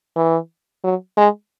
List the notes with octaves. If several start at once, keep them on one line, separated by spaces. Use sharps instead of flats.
E3
F#3
G#3